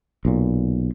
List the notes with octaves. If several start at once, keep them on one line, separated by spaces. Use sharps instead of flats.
B1 A#2